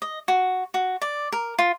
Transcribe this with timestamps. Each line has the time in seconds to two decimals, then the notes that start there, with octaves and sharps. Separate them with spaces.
0.02 D#5
0.28 F#4
0.74 F#4
1.02 D5
1.32 A#4
1.59 F4